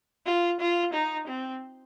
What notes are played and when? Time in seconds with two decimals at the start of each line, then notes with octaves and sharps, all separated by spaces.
0.26 F4
0.60 F4
0.93 D#4
1.27 C4